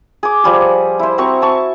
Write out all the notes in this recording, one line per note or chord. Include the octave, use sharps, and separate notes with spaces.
G#4 D6
F3 G3 G#4
E4 C5
C4 F#4 A#5 C#6
A5 C#6